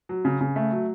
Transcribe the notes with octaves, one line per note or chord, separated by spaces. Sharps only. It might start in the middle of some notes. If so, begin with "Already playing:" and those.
F#3
C#3
C#3
A3
F#3